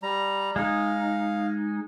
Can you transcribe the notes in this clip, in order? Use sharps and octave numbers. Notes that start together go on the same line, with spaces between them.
G3 A#5
G#3 D#4 F5